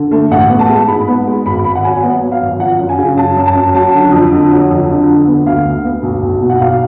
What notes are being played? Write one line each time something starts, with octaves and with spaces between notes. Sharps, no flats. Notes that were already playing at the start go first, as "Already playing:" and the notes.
Already playing: D3
A3
A1 F#5
B3
A5
G#3
G#2 B5
B3
G#3
G#1 B5
G#1 B5
F#5
F#3 G#5
B3 F#5
F#3
F5
G#1
F3 F#5
F#2
G#5
C#3
F#2 A5
F#2
A5
F#2
F#3 A5
D3
F2
D3
F#3
F2
D3
D3
B3
D2 F5
D2
B3
B1
B1
B2
F#5
B1 F5